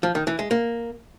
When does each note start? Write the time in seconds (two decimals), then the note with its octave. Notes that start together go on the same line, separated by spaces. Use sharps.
0.03 F3
0.15 D#3
0.27 E3
0.39 G#3
0.51 A#3